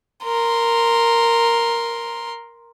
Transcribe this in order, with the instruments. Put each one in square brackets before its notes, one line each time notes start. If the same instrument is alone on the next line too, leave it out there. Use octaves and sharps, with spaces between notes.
[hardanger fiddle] A#4 C6